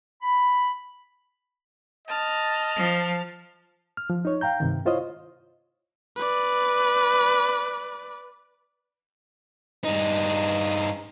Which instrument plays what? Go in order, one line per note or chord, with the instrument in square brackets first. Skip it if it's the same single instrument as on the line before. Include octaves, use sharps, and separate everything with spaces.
[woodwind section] B5
[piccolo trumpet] D#5 [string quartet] A5 F6
[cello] F3
[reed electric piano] F6
F3
D#4 C#5
F5 G5 A#5 G6
G2 C3 D#3
E4 F4 C5 C#5 D#5 F5
[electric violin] B4 D5
[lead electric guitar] G2 D#4